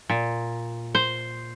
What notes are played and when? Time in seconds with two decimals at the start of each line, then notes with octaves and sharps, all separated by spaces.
0.09 A#2
0.95 C5